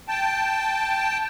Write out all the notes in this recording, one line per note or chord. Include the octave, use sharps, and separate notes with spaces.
G5 A5